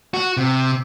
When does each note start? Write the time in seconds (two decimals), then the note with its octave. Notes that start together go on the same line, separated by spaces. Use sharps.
0.14 F#4
0.37 C3